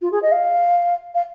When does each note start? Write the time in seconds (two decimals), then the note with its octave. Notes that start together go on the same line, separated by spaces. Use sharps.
0.02 F4
0.12 G#4
0.22 D#5
0.32 F5
1.15 F5